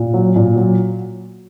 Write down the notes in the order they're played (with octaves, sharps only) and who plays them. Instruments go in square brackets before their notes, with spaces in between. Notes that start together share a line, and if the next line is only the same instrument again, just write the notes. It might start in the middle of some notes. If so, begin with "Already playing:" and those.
Already playing: [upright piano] A#2
F#3
A#2
F#3